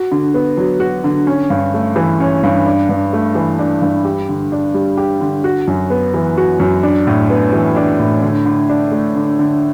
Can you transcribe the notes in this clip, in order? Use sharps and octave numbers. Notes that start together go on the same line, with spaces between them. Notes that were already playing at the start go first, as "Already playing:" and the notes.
Already playing: F#4
D3
B3
F#3
F#4
D3
C#4
G2
A3
E3
C#4
G2
D4
G2
A3
E3
D4
G2
G4
D3
D4
G3
G4
D3
F#4
F#2
B3
E3
F#4
F#2
D4
A2
B3
E3
D4
A2
D3
D3
D4
A3
D3
D3